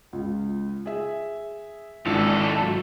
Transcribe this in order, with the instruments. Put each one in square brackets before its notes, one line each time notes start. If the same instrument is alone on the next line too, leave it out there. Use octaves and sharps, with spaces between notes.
[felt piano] C#2
G#4 E5
[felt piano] G#1 E3 D4 [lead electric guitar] C#2 A4
[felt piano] F#3